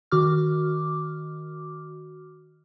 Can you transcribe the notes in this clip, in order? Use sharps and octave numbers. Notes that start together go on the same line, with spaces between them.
D#3 F#4 D6 F6